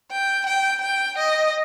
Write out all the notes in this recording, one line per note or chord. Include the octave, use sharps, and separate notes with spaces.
G5
G5
G5
D#5